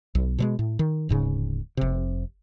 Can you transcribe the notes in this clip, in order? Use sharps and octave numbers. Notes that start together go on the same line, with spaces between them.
B1
B2 F#3 G#3
A2
D#3
D1 G#2 C#3
F1 C3